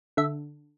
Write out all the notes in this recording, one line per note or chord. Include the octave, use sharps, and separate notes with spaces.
D3 E5